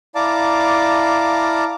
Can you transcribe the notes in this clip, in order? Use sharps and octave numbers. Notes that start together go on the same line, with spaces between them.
E4 D5 F5 A5 A#5 D6